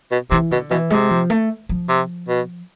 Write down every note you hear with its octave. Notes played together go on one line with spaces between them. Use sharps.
B2
C3 E3
B2 D3
B2 E3
C3 G#3
F3
A3
F3
C3
B2